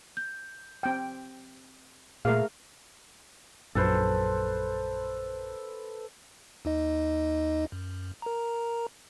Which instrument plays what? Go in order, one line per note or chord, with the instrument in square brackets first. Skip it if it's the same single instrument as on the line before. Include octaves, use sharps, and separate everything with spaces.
[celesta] G6
[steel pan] C4 G5
[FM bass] A#2 [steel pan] A3 A#4 F5 [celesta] G#4 E5
[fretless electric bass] A#1 F#2 [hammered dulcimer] A4 B4 C5
[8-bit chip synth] D#2 D#4 D#5
F#2
A#4 A#5